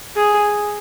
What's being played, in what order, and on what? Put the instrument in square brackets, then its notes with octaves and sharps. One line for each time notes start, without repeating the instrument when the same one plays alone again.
[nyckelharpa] G#4